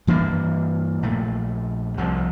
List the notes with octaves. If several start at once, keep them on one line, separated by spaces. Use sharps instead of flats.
G2 E3 A#3 D4
A#1 A#2 A3
C2 C3 F3